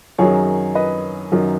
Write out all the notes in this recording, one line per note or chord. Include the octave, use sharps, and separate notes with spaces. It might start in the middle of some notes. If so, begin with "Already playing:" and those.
F#2 D#3 F#3 G#4 C#5
B4 D#5
F#2 D#3 F#3